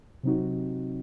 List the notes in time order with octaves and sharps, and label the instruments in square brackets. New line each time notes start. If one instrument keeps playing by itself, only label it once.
[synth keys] C3 F#3 C4 D#4 F#4